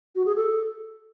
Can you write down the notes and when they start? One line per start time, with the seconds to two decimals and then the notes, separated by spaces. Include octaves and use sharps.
0.15 F#4
0.26 G#4
0.36 A4